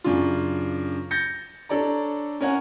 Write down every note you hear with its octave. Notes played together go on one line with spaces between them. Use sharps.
F#2 C#3 D4 F4
G6 A6 A#6 C#7
D4 A4 C#5 D5 A#5
C#4 A#4 C#5 F#5 G#5